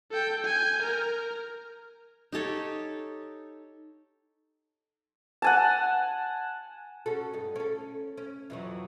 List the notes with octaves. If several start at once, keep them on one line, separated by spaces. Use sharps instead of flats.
A4 G5
G#5 G6
A#4
D#4 G4 A4 C#5
F#5 G#5 A5
C#4 F#4 A4
G2 D#4 A4
C#4 A4
C#4
F2 E3 F#3